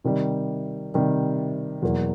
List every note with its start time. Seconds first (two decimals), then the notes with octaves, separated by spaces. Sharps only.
0.04 C3 D#3 G3
0.94 C3 D#3 G3
1.82 E2 B2 F#3 A#3